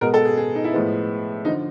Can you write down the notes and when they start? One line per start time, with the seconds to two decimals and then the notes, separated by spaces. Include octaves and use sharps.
0.01 B2 G#3 B3 A#4
0.14 A4
0.25 G#4
0.37 G#4
0.55 D#4
0.64 E4
0.73 A2 F3 G#3 B3
1.45 D3 F3 D#4